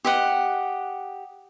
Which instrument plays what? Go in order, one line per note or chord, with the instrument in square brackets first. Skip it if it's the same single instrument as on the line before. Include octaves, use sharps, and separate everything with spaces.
[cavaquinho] G4 D#5 F#5